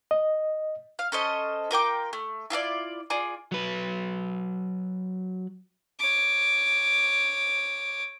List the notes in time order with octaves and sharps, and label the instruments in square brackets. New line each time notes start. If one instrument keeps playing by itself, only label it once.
[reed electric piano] D#5
[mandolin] F5
C#4 A4 C5 D#5
F4 A#4 G5 D6
A3
E4 F4 A4 D5
F4 G#4 D5
[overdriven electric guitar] F#3 B4
[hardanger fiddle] C#5 D6